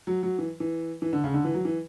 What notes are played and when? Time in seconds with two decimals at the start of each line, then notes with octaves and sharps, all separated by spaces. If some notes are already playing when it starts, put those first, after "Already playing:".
0.07 F#3
0.23 F#3
0.38 E3
0.60 E3
1.02 E3
1.13 D3
1.24 C#3
1.34 D3
1.44 E3
1.54 F#3
1.65 E3